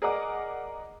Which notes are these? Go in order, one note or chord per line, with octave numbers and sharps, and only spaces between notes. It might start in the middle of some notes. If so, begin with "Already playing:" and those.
G#4 A#4 D5 D#5 F#5 D6